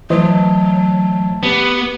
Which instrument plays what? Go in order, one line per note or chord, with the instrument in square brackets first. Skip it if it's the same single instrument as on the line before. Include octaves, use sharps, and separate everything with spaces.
[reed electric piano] E3 C5 D#5 [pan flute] F#3 [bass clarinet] A3
[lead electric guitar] B3 [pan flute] G4